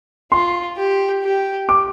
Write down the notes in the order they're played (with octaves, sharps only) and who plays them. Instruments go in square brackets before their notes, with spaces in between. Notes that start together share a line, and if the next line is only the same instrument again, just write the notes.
[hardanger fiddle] F4 [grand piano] C6
[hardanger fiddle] G4
G4
[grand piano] D6